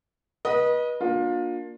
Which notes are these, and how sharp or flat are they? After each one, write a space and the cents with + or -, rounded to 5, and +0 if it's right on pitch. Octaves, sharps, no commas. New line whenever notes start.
B4 -30 D#5 +0
A#3 +10 D4 +0 F4 +25